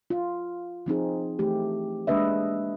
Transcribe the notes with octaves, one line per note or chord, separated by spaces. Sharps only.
F4
F3 C4 D#4 G#4
E3 A3 G4
G#3 A#3 D4 B4 D#5 E5